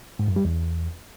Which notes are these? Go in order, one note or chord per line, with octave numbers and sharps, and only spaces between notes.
G#2
F#2
G3
E2